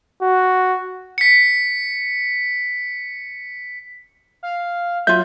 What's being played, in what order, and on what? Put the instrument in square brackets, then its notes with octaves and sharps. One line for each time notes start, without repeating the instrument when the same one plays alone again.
[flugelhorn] F#4
[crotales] B6 C#7
[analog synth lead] F5
[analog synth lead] F#3 [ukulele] F4 E5 [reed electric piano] G6